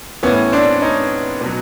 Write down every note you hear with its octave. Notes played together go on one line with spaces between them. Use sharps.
A2 E3 B3 C#4
C4 D4
C#4 D#4
B2
F#3